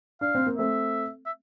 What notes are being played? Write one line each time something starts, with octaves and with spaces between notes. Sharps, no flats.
D4 F5
C4
A#3
A3 C4 E5
E5